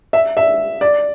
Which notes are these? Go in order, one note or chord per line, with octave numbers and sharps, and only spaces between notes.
E5
E5
D5